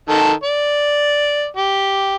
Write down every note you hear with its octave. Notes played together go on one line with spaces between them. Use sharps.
D#3 A4
D5
G4